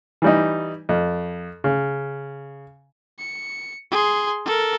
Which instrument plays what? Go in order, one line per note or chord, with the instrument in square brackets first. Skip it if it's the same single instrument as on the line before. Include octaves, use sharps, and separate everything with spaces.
[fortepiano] E3 G3 D#4
F2
C#3
[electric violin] C#7
G#4 C6
A4 A#4